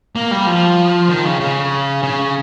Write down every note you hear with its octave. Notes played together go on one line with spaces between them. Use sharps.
A#3
G3
F3
D#3
C#3
C#3
C#3